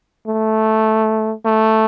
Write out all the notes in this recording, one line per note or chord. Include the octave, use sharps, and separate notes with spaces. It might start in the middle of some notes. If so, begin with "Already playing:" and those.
A3
A3